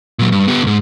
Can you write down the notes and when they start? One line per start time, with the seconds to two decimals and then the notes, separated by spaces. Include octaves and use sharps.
0.19 A#2 F#3
0.32 G2
0.48 B3 G4
0.63 C#2 G#2